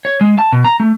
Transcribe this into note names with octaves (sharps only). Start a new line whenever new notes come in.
C#5
G#3
A5
B2
A#5
A3